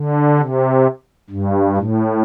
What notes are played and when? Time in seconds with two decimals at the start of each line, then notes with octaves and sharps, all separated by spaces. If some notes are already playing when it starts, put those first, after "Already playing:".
Already playing: D3
0.39 C3
1.30 G2
1.77 A2